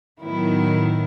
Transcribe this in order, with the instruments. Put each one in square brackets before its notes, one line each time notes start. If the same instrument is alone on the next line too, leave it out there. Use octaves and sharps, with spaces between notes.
[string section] A2 D#3 F#3 B3 E4